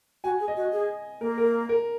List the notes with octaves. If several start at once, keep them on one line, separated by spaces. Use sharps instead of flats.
F#4 G#5
G#4
D#5
F#4
G#4
A#3 A#4
A#4
A#4